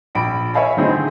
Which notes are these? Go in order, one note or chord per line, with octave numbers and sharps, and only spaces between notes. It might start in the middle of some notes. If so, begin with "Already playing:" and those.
A#1 B5 D7
C#5 E5 F5 G#5 B5
D3 A3 C4 D#4 E4 G#4